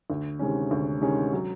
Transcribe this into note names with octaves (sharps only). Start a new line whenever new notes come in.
D2
C3 D#3 G#3 C#4
D2
C3 D#3 G#3 C#4
F#3